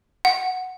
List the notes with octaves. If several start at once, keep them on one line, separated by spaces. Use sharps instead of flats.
F#5